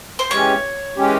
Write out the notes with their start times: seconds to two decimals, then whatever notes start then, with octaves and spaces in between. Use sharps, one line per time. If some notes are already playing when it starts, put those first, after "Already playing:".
0.19 C5
0.31 E3 G#3 C#4 G4 C#5
0.97 E3 G#3 C#4 G4